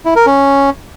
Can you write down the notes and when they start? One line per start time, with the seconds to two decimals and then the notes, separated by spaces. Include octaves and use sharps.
0.05 E4
0.16 A#4
0.26 C#4